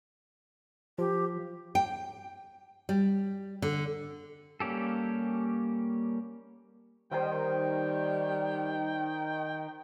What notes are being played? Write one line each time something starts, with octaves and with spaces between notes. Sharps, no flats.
F3 G4
G5
G3
D3
G3 A#3 C#4 G4 A4
D#3 G3 C5 G5 D#6